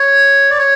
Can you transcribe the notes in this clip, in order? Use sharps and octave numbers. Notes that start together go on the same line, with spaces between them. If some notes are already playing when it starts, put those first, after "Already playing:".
Already playing: C#5
D5
C#5